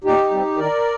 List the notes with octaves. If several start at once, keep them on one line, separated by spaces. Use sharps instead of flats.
A#2 D#4 G4
G3 C4
D#3 A#4 D5